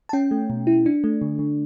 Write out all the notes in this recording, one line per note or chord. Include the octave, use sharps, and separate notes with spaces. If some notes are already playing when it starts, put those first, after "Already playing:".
A5
C#4 G5
A3
B2
E4
D4
A3
D3
D3